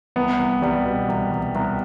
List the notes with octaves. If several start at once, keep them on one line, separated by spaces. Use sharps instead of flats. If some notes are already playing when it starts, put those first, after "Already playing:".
C2 B3
C2
C2 G3
B2
C2
C2
C2